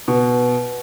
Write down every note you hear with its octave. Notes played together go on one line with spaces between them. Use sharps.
B2